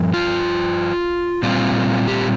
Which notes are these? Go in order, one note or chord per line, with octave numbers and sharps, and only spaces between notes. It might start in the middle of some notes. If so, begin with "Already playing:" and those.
Already playing: G2 F3
F4
A#2 G3 C4 F4
G4